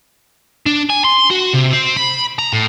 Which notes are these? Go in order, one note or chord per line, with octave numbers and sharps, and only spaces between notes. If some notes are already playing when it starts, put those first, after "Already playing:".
D4
G#5
C6
F#4
C3
C4
B5
A#5
A2